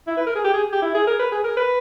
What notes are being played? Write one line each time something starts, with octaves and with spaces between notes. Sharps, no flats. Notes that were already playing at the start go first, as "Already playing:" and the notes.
E4
B4
A#4
G#4
G4
G#4
G4
E4
G#4
A#4
B4
G#4
A#4
B4